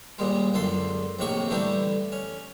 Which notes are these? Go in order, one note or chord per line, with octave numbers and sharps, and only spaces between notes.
D#2 A#2 G3 G#3
C#2 F#2 D3 A4 C6
A#1 A2 C3 D#3 A#3 C#6
D3 E3 G3 A3 D4 G4
C#4